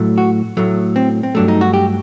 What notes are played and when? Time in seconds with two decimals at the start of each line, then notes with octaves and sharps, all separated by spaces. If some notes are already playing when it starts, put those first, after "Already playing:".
Already playing: A2 F#3 A3
0.18 F#4
0.57 A2 F#3 A3
0.96 C4
1.23 C4
1.35 G2 F#3 A3 D4
1.48 D#4
1.61 F#4
1.74 G4